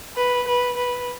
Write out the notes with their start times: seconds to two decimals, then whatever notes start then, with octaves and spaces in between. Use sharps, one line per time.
0.17 B4
0.47 B4
0.77 B4